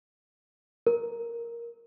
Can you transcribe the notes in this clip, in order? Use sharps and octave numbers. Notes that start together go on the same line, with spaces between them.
A#4